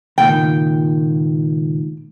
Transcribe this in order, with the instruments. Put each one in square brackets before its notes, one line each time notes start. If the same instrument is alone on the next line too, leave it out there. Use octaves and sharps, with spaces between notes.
[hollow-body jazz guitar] C#2 A#2 D#3 [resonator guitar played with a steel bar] G5